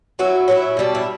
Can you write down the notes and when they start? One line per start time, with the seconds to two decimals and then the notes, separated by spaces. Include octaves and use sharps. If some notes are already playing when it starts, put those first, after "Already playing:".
0.19 F#3 C#4 E4 F#4
0.48 F#3 C#4 E4
0.77 B2 G3 D4
0.95 E4